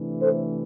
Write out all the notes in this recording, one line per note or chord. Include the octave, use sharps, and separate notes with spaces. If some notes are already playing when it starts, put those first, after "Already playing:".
Already playing: C3 E3 A3 D4
A4 C5